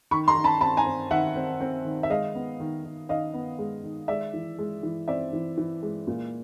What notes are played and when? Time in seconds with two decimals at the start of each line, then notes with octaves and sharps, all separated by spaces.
0.11 D#3 B5 C#6
0.28 A#5 C6
0.36 D#3
0.44 A5 B5
0.61 C4 A5 B5
0.77 G#5 A#5
0.86 C4
1.11 D#3 E5 F#5
1.36 C4
1.61 C4
1.85 D#3
2.03 E5
2.10 G#3 D#5 F5
2.35 B3
2.60 D#3
2.84 D#3
3.09 D#3 D#5 F5
3.34 B3
3.58 G#3
3.84 D#3
4.08 G#3 D5 E5
4.33 E3
4.58 G#3
4.83 E3
5.08 C4 D5 E5
5.33 E3
5.58 E3
5.82 G#3
6.07 A#2